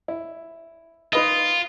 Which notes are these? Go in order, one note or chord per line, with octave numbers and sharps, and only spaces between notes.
E4
D#4 F4 B4 D#5